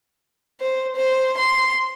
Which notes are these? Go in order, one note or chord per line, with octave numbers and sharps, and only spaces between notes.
C5
C5
C6